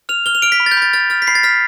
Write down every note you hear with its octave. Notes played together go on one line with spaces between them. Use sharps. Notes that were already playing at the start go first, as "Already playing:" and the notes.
F6 F7
F6 G7
F7
F6 D7
B6
B5
A6
G6
B5 A6
F6 A6
F6 A6
B6
B5 C7
A6
F6 B6